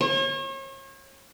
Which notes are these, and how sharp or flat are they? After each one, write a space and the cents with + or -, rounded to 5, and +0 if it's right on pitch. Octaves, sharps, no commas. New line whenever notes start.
C#5 -40